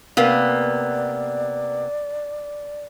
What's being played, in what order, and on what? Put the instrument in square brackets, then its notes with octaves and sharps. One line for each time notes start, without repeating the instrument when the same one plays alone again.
[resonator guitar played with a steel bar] C3 A#3 B3 [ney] D5